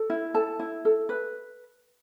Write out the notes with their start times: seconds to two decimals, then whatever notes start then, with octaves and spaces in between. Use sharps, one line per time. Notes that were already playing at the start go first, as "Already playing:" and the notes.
Already playing: A4
0.10 E4
0.34 A4 A5
0.59 E4
0.85 A4
1.09 B4